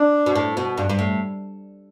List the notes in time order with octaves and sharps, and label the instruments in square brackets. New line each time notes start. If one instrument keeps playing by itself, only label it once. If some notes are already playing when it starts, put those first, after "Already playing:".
Already playing: [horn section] D4
[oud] B2
A2
B2
G2
G2
A2